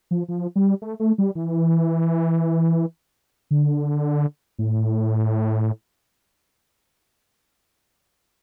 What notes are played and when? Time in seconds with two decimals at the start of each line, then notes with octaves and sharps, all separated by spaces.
0.11 F3
0.28 F3
0.56 G3
0.82 A3
1.00 A3
1.18 G3
1.35 E3
3.51 D3
4.59 A2